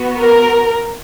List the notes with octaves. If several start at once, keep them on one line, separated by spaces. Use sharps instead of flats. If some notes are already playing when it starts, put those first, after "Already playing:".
Already playing: B3 F#4
A#4